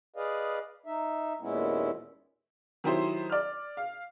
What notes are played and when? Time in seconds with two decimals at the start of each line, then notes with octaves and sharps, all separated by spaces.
0.16 G#4 B4 D5 D#5 F5
0.86 D#4 E5
1.41 D#2 A#2 G#3 B3 C#4 E4
2.84 D#3 F#3 E4 G4 C5
3.30 D5 F6
3.77 F5